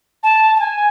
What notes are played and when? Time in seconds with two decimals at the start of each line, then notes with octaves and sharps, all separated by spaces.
0.23 A5
0.55 A5
0.59 G#5